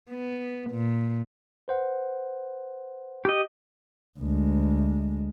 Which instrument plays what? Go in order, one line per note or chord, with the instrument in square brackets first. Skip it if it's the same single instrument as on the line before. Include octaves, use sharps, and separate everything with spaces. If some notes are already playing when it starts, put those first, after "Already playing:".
[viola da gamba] B3
A#2
[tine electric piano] B4 C5 F#5
[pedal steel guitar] G4 D#5
[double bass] D2 G#3